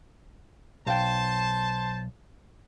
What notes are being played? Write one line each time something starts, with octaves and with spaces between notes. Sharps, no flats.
B1 C5 F5 G5 A5